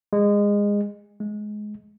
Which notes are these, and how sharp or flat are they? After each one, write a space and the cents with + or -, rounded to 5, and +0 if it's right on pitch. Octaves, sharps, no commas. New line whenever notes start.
G#3 -20
G#3 +20